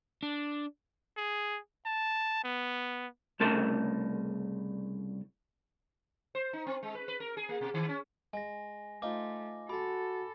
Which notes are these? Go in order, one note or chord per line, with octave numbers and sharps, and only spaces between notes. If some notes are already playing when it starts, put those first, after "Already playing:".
D4
G#4
A5
B3
C2 C#3 A3 A#4 A5 C6
C5
D#4
C4
G#3
B4
B4
A#4
G#4
A#3
B2
D#3
C#4
G#3 G#5 A#6
A3 D#4 F4 C5 D6
F#4 A4 B5 C6 D6